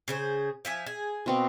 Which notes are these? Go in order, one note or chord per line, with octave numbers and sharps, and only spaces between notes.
C#3 G#4 C5
F3 E5 G#5
G#4
B2 C4 F5